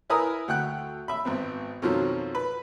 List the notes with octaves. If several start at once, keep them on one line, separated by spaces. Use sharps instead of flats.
E4 A#4 B4 G#5 A#5 D#6
D2 F#5 G5 F#6
E5 B5
G#1 B3 C4
F2 B2 D#3 F3 F#3
B4